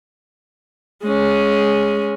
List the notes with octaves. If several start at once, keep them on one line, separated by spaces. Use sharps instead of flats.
G#3 C#4